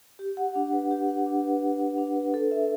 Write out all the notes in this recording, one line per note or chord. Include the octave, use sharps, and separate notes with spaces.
G4
F#5
D4
B4
G4
F#5
D4
B4
G4
F#5
D4
B4
A4
E5